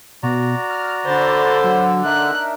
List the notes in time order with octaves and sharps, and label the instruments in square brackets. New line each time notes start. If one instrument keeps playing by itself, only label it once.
[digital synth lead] B2 [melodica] F#4 D5 A#5
[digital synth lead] F6
[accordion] D3 [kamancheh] C5 B5 [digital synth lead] A6
[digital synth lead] F#3 [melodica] E6
[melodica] D4 D#4 A#4 [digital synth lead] E5 [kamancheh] F#6